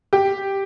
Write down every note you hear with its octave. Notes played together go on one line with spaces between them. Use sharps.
G4